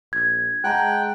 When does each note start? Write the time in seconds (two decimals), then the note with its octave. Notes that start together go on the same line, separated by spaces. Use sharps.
0.13 A#1 G#6
0.64 G#3 F#5 G5 A5 A#5 F#6